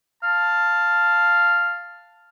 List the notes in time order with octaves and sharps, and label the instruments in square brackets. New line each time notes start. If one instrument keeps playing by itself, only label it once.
[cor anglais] F5 [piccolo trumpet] A5